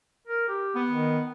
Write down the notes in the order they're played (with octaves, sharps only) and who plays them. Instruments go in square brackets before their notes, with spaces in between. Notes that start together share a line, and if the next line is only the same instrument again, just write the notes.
[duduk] A#4
G4
[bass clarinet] B3
[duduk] D#3